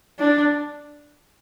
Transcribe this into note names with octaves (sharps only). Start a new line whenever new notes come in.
D4